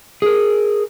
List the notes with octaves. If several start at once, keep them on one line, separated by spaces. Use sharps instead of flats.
G#4 A#4